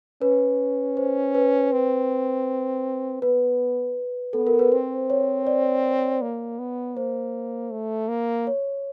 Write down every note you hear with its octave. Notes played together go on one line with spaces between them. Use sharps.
C#4 B4
C5
B4
C4 B4
B3 B4
B3 A4
A#4
B4
C4 C5
C#5
D5
A#3
B3
A#3 C5
A3
A#3
C#5